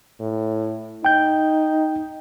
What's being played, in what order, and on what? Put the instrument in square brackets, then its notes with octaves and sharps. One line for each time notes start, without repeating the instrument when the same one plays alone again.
[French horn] A2
[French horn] D#4 [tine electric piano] G5 G6